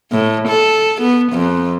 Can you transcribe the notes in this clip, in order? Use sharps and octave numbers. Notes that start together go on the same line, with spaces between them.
A2
A4
B3
F2